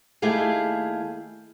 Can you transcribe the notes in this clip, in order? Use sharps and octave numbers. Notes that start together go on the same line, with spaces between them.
D#2 A3 E4 G4 G#4 F5